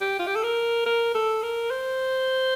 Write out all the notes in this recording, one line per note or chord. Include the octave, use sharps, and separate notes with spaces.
G4
F4
G4
A4
A#4
A#4
A4
A#4
C5